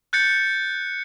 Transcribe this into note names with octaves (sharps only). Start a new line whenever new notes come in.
F#6 G6 A6 C#7